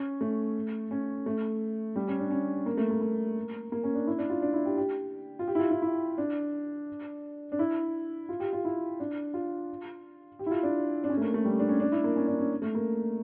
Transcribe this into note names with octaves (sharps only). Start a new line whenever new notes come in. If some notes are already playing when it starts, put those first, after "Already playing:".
Already playing: C#4
A3
C#4
A3
G3
C#4
D4
C#4
A#3
A3
A#3
A#3
A#3
C#4
D4
E4
D4
F4
D4
E4
G4
G4
F4
G4
E4
F4
E4
E4
D4
D4
E4
F4
G4
F4
E4
D4
F4
G4
E4
F4
D4
D4
C#4
A3
A#3
A3
G3
D4
C#4
D4
E4
A#3
C#4
D4
C#4
A3
A#3